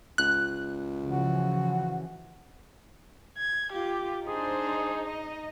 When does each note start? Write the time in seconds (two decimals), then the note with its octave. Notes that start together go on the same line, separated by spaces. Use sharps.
0.18 C#2 F#6
1.07 C#3 E3 F3 F#4
3.38 G#6
3.73 F4 G4
4.27 D4 D#4 G#4 C5
5.04 D#5